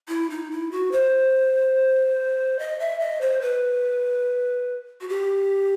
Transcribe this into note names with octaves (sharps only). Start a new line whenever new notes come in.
E4
D#4
E4
F#4
C5
D#5
E5
D#5
C5
B4
F#4
G4